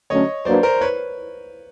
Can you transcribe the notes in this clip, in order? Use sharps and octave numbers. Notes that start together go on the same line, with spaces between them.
D3 F#3 A3 C#4 C#5 D#5
F#3 A#3 D4 F#4 B4 C5 D5
A#4 C5
B4 C#5